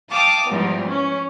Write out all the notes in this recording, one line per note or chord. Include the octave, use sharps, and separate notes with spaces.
F5 G5 A5 D6 D#6
E2 G#2 F3 G3
C#4